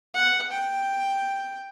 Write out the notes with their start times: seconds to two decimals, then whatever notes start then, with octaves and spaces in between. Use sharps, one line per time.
0.14 F#5
0.52 G5